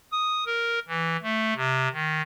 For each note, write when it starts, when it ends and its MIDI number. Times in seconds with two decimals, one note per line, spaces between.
0.12 0.44 87
0.46 0.79 70
0.88 1.17 52
1.22 1.54 57
1.56 1.88 48
1.93 2.21 51